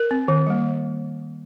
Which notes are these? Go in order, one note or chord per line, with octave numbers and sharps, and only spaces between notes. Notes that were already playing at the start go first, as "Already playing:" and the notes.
Already playing: A#4
C4
D#3
G3 A#3